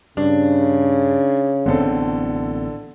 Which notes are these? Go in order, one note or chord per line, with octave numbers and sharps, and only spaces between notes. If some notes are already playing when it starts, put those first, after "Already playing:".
G2 C#3 D4
A1 D3 B3 C4 A4